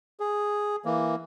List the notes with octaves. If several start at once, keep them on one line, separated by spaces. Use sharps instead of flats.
G#4
E3 A#3